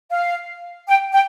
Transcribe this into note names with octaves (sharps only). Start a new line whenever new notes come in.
F5
G5
G5